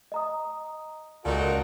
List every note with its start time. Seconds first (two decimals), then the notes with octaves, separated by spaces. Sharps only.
0.12 D#5 A#5 D#6
1.25 C#2 A#2 D#4 F#4 A4 A#4 D5